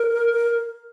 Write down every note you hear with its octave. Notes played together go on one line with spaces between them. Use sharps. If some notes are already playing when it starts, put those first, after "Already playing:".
Already playing: A#4
A#4